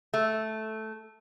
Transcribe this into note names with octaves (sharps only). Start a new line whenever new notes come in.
A3